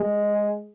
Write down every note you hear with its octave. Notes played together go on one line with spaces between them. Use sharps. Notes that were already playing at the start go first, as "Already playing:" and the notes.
Already playing: G#3